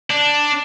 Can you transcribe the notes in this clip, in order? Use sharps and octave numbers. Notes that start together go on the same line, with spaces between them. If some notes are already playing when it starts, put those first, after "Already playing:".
D4